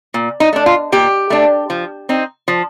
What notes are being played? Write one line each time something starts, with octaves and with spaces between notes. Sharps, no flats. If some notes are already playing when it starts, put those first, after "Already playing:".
A#2
D#4
A3 D4
F4
A#2 G4
A3 D4
F3
C4 D#4
F3